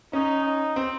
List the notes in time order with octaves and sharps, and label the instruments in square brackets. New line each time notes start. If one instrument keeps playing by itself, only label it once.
[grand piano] C#4 [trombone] D#4
[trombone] D#4
[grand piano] C4